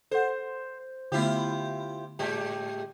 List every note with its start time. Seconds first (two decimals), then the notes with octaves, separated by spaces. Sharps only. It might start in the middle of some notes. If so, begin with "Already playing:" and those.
0.12 A4 C5 F#5
1.12 D3 A3 B3 E4 F4 G4
2.19 A2 G#3 G4